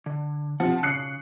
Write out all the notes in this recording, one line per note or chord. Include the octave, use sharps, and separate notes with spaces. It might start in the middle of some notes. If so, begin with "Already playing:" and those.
D3
C3 F3 F#5
C#3 F#6 C7 C#7